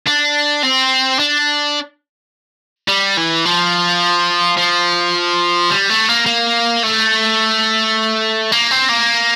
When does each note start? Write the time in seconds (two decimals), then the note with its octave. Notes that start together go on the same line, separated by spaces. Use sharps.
0.07 D4
0.63 C4
1.19 D4
2.88 G3
3.17 E3
3.45 F3
4.57 F3
5.70 G3
5.90 A3
6.08 A#3
6.26 A#3
6.84 A3
8.52 A#3
8.71 C4
8.89 A#3